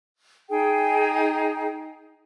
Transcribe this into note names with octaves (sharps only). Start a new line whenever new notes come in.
D#4 G#4 G5